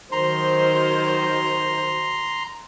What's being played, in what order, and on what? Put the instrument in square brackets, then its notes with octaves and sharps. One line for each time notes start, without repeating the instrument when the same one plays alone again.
[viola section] D#3 F#3 C5 [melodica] A#5 C6